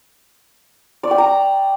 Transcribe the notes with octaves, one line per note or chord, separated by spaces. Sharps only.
D5
G5
A#5